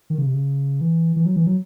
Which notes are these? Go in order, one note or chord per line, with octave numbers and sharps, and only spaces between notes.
D#3
C#3
C3
C#3
E3
E3
F#3
E3
F#3